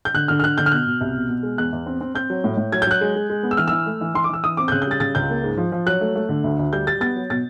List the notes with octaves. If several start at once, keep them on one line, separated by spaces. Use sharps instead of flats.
G6
D3 F#6
D3 F6
F6
D3 F#6
D3 G6
F6
B2 F#6
B2
C2
B2
B2
G#3
E2 F#6
E2
C4
C4
C4 G6
F#3
A2
A2
F#3 G#6
G6
F#3 F#6
G#3
G#3
G#3
B3
E6
E3 F6
E6
E3
A3
E3
E3 C6
D6
E3 E6
E3 D#6
C4 D6
G6
C#3 F#6
G6
G3 A6
C#3 A6
C#2 G6
A#3
G#2
F3
F3
F#3 F#6
A3
A3
D3
D2
D2
G3 G6
G3 A6
B3 A6
F#3
B2 A6